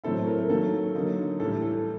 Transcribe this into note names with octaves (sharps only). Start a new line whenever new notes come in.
A2 F#3 A3 C4 E4 A4
A#4
A#4
D#3 F#3 A#3 A4
D3 F#3 A#3 D#4
A2 E3 G3 A4
A4